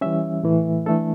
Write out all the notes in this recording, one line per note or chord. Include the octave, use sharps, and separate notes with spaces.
E3 G3 C#4 E5
A2 E3 A3
E3 A3 D4 A4